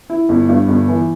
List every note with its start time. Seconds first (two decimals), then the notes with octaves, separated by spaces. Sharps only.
0.10 E4
0.29 G1
0.49 G2
0.68 G1
0.88 E3